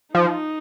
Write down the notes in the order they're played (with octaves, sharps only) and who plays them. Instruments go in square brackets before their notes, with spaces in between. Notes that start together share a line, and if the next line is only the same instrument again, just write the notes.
[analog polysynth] F3 [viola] D#4